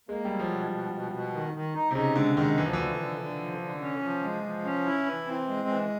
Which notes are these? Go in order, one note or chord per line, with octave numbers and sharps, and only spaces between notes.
G#3 A#3
F#3 G3
F3
B2
B2
B2
B2
D#3
D#3
D#4
C3
C#3 D#4
D3 G#3
D#3 G#3
D2 E3
F3
D3 E3
D3
D3
F3
D3
C#4
F3
G#3
F3
C#4
E4
E3
C4
G#3
E3